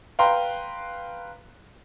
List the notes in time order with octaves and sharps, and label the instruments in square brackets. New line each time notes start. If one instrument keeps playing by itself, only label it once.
[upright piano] B4 F5 G5 A#5 C6